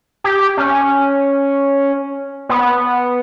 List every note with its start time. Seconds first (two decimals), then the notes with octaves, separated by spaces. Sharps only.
0.24 G4
0.57 C#4
2.49 B3